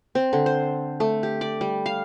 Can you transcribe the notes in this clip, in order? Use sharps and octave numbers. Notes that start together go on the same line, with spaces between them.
C4
D3
C5
A3
G4
D5
G3
F5